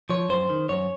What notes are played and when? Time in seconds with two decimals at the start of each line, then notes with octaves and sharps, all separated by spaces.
0.10 F3 C#5
0.29 F#2 C5
0.49 D#3
0.69 F#2 C#5